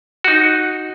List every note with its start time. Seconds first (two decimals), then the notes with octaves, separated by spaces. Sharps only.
0.24 D#4 F#4